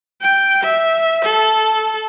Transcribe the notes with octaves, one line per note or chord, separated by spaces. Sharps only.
G5
E5
A4